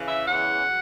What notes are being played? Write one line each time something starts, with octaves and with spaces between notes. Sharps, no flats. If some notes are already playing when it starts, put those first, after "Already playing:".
Already playing: C#3 E3
E5
E2 C#3 E3 F#5
F#3